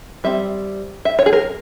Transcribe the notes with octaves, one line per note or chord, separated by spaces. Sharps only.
G3 C4 E5
E5
C#5
G#4
A#4